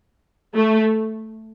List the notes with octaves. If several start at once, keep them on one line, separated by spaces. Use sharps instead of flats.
A3